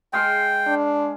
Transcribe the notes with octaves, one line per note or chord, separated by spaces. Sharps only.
G#3 F5 G5 C6
D4